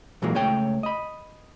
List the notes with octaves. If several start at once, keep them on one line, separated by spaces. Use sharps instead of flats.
A#2 E3 F#3 G#3 A#3
C#2 A3 C#5 G5
D#5 B5